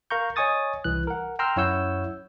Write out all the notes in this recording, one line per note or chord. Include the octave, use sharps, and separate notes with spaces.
A#4 F5 A#5 C#6 G6
C#5 D#5 G#5 C#6 D#6 A6
C2 E3 F#6
A#4 F#5
G5 A#5 C6 E6 F6
F#2 E4 C#5 F#5 E6 G6